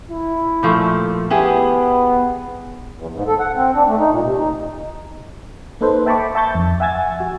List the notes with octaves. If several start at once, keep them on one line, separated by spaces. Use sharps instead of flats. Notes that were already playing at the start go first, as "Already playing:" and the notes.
E4
A#2 F3 A3
B3 E4 G4 G#4
E2
G#2
A4
F#5
C4
D4
A3
D#4
A#2
C3
D#4
A#3 D#4 A4 B4 C5
E5 G5 A5 B5 C#6 D6
E5 A5 C#6 G6 A6
F2
E5 F#5 G#5 E6 G#6 A6
F#4